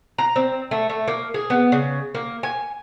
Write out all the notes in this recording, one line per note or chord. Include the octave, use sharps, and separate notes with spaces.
A#5
C4
A3
A3
A#3
G#4
B3
C#3
A#3
G#5